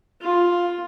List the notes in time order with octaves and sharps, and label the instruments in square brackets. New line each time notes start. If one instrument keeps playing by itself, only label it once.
[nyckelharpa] F4